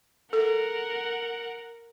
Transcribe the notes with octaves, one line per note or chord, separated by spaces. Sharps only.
A4 A#4 F#5